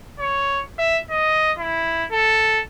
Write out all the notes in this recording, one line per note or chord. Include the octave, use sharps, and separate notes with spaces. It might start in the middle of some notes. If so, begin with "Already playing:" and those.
C#5
E5
D#5
E4
A4